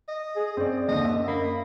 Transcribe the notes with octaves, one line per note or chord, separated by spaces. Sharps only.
D#5
G#4
F#2 C4 D5
D#2 D3 D#5
E5
A#3 B5